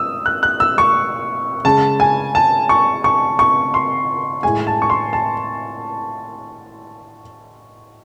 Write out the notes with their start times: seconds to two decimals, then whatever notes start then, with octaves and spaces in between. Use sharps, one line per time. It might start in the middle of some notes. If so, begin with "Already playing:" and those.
Already playing: D#6 E6
0.26 F#6
0.43 F#6
0.60 E6
0.78 C#6
1.65 C#3 G#3 A5
2.00 G#5
2.35 A5
2.69 C#6
3.04 C#6
3.39 C#6
3.74 C6
4.43 A2 G#3 G#5
4.67 A5
4.82 C#6
4.90 C6
5.13 A5